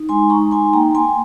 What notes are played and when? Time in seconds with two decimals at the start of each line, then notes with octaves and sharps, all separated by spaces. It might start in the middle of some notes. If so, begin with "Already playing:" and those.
Already playing: D#4
0.09 G#3 G#5 C6
0.30 D#4 A#5 C#6
0.51 D#4 G#5 C6
0.73 A#3 G5 A#5
0.95 A#3 G#5 C6